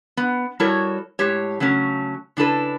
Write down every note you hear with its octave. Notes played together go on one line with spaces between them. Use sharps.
B3
G3 E4 F#4 A4 A#4 C#5
A2 G#3 G4 C#5
C#3 F#3 A3 C#4
C#3 D4 E4 A4 B4